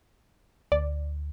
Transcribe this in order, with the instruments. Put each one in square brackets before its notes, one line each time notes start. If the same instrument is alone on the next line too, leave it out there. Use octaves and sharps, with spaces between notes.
[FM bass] D2 [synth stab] D5